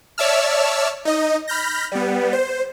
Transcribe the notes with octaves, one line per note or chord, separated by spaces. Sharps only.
C#5 D5 E5 A5 E6 F6
D#4 D#5
B5 F6 G6 A#6
G3 B3
C5